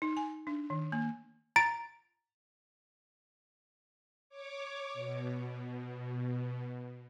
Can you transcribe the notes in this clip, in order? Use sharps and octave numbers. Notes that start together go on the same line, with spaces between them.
D#4
G#5
D4
D#3
A#3
A#5 A6 D7
C#5 D6
B2